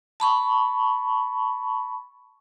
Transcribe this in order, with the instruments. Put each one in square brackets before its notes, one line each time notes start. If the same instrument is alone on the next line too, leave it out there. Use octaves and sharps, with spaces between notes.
[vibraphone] A5 B5 C#6